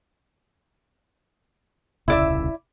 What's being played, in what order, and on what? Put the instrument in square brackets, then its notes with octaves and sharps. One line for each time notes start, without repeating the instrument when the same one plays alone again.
[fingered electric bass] D#1 C2 C#3 [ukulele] E4 D5 E5